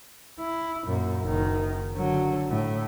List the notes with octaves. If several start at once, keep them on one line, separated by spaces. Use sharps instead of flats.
E4
F#2 A#2
F#1 D#3
D3 F#3
A2